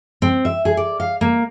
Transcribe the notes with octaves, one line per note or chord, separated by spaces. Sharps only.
C4
E5
G#4
D5
F5
A#3